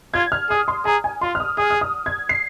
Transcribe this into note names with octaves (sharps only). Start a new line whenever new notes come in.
F4 G#6
F6
G#4 D#6
C6
G#4 A#5
G#5
F4 C6
F6
D#6
G#4 D#6
F6
D#6
G#6
C7